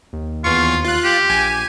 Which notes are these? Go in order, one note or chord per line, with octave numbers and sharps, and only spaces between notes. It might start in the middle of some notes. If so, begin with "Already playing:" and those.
D#2
E2 F4 C#6
F4 F#6
G4
A#1 G#5